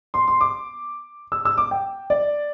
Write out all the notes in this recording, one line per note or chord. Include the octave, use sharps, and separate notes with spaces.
C6
C6
D6
E6
E6
D6
G5
D5